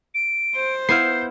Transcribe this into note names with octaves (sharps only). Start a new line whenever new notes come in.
D7
C5
B3 E4 F5 G6 C7